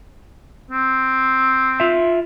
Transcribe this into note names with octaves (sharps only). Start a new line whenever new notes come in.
C4
F4 E5